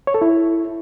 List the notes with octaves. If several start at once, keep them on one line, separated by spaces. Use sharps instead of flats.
C#5
A4
E4